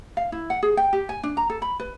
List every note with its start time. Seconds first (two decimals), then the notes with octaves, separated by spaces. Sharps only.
0.17 F5
0.32 E4
0.50 F#5
0.63 G#4
0.77 G5
0.93 G4
1.09 G#5
1.23 D4
1.37 A#5
1.50 A4
1.62 B5
1.80 B4